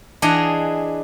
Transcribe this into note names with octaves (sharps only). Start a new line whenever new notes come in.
E3 D4 G#4 D#5 F5 F#5